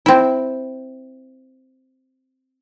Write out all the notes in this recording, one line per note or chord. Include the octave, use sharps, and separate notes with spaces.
C4 E4